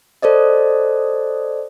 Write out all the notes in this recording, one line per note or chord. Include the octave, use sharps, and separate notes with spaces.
A4 C5 D5 D#5